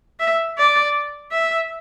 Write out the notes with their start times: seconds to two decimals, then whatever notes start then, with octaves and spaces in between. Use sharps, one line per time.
0.20 E5
0.58 D5
1.31 E5